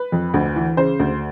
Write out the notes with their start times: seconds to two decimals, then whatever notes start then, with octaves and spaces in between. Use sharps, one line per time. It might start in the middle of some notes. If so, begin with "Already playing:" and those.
Already playing: B4
0.12 F2
0.34 D2
0.56 E3
0.77 C#3 C5
1.00 D2